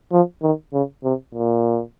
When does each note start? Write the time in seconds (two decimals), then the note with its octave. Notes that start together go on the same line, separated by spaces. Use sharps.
0.12 F3
0.43 D#3
0.73 C#3
1.04 C3
1.35 A#2